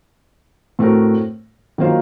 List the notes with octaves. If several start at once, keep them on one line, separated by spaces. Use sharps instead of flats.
A2 A3 C4 F#4 A#4
D#3 F#3 A#3 F4 C5